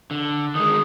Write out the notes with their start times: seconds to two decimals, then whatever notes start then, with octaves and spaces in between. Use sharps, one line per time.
0.11 D3
0.55 D#3 G#3 D#6